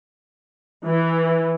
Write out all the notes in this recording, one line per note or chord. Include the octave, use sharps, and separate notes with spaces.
E3